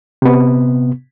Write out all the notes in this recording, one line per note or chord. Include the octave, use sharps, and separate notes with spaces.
C3 B3